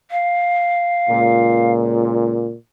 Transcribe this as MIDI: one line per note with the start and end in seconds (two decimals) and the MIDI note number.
0.11 1.72 77
1.10 2.55 37
1.10 2.55 46